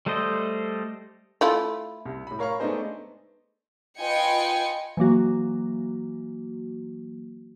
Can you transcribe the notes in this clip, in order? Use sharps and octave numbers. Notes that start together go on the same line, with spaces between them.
G3 A3 A4 C5 D#5
A3 E4 F4
C2
A2 B5
A#4 C#5 F5 B5 C#6
G#3 A3 B3 D4 D#4 C5
F4 B4 D#5 G5 G#5 C#7
E3 F#3 A#3 F#4